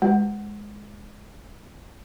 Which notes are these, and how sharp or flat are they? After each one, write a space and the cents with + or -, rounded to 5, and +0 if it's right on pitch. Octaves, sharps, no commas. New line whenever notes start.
G#3 +0